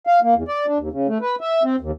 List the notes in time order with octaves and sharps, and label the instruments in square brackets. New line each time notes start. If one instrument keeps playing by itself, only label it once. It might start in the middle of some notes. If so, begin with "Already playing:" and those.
[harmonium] F5
A#3
E2
D5
D4
D#2
C#3
A3
B4
E5
C4
D#2